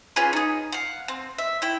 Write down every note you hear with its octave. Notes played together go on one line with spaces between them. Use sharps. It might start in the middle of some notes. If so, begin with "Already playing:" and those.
C#4 F4 G#4 B4
D#4 G#4
F5 F#5
C4
E5
E4 G5